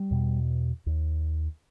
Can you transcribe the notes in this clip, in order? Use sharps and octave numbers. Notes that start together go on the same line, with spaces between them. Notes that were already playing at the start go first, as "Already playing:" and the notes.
Already playing: G3
E2 B2
D#2